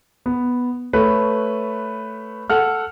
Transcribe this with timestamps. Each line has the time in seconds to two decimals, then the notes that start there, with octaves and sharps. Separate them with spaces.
0.26 B3
0.93 A3 B4 C#5
2.50 A4 F#5 F6